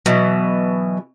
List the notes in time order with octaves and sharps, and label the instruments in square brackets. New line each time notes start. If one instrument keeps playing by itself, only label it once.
[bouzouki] B2 E3 [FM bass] F#3